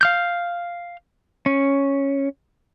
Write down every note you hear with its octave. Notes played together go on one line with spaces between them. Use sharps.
F5 F6 G6
C#4